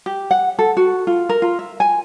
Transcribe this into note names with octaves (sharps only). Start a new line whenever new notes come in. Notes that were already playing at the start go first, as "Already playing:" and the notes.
G4
F#5
A4
F#4
F4
A#4
F4
E5
G#5